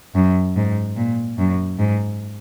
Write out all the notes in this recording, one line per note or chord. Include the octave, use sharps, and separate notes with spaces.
F#2
G#2
A#2
F#2
G#2